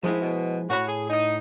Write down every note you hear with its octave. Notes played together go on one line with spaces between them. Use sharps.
G#2 D#3 F3 G#3 E4
B2
A2 F#4 C#5 B5
G#4
D#4